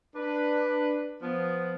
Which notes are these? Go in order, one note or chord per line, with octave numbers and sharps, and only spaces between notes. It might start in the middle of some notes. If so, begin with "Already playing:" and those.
D4 B4
F3 B3